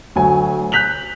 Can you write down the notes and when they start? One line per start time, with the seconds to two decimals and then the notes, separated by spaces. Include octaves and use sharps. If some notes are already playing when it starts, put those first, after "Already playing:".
0.16 D2 F#3 G#5
0.72 F#6 G6 B6 F7 F#7